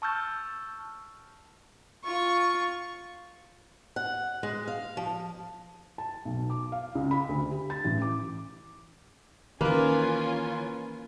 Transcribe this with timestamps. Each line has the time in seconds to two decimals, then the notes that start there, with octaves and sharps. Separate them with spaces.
0.02 A5 C#6 E6 F6 G6 A6
2.04 F4 C#6
3.96 F#5
4.43 G#3
4.68 F5
4.97 F3
5.98 A5
6.25 B1
6.50 D6
6.72 F5
6.95 C#2
7.11 B5
7.29 D2
7.51 G4
7.70 A6
7.84 A1
8.02 D6
9.61 D#3 E3 A#3 C#4 F4 A#4 B4 G#5